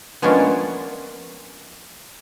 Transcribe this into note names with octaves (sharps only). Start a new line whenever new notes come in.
F3 G#3 A#3 B3 C#4 D4